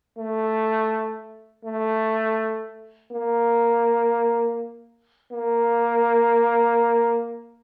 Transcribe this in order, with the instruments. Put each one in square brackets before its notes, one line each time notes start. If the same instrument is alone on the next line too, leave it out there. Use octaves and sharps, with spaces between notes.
[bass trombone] A3
A3
A#3
A#3